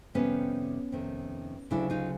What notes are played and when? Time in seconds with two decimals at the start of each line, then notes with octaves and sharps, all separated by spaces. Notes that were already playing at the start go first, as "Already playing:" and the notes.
0.14 F2 C3 D#3 G3 B3 C#4
0.92 F2 C3 D#3
1.71 D2 C#3 F#3 D4 E4
1.90 D#4 F4